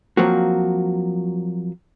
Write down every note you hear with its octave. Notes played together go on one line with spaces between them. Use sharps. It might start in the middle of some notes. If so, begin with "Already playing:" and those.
F3 F#3 A#3 C4 F#4